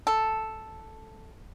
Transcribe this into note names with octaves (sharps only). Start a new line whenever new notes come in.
A4